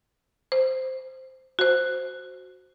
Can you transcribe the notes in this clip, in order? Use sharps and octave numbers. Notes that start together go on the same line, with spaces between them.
C5
F#4 C5